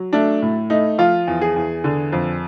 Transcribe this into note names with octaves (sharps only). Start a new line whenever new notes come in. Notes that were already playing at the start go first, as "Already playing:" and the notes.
Already playing: F#3
A3 D4
A2
A3 D#4
F3 F4
E2
G#4
E2
D3
F2